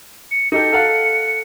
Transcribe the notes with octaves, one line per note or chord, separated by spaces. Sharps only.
C#7
D#4 G4 A4 C#7
A4 F5 F#5